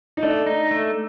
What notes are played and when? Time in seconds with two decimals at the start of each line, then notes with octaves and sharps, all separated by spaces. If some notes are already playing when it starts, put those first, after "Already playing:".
0.17 D#4
0.23 A3 D4
0.47 D#4
0.71 A3